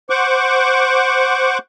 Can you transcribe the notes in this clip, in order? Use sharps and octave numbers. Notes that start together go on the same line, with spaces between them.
C5 F#5 C#6 D6